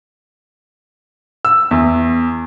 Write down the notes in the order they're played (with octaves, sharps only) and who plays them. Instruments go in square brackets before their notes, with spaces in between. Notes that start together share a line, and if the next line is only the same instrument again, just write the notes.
[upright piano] E6
E2